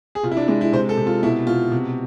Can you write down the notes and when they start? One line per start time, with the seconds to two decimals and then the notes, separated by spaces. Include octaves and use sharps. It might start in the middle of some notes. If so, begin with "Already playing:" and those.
0.15 G#4
0.23 C3 F4
0.32 E4
0.37 D4
0.48 G#3 D4
0.61 E4
0.73 C3 C5
0.89 A4
0.97 C3
1.07 F4
1.23 B2 E4
1.47 B2 F4
1.72 C3